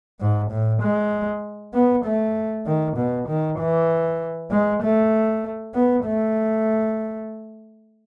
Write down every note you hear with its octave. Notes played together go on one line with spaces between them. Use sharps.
G#2
A2
G#3
B3
A3
D#3
B2
D#3
E3
G#3
A3
B3
A3